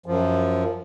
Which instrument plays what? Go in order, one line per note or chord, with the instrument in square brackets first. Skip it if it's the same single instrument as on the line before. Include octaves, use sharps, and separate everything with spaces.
[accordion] F#2 F3